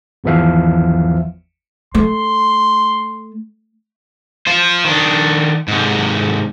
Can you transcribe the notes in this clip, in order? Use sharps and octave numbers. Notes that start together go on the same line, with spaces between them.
G#1 E2 E3 F3 E5 F5
A3 C6
F4 C5
D#3 D4
G#2 C3